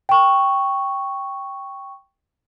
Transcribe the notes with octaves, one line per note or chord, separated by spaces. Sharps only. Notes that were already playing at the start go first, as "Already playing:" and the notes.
G5 C#6